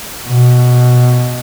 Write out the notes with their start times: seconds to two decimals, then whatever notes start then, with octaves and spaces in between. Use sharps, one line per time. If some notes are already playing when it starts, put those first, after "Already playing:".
0.28 B2